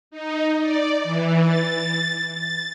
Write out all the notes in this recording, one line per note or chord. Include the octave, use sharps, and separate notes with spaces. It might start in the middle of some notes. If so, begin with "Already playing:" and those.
D#4
D5
E3
A6
A6